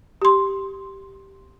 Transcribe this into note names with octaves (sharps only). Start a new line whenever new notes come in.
G4 C6